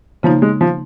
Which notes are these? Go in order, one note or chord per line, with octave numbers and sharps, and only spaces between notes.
C#3 F3 A#3 D#4
G#3
F3